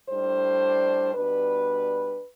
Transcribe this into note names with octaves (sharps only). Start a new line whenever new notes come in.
A2 G3 D4 C5
B2 G3 D4 B4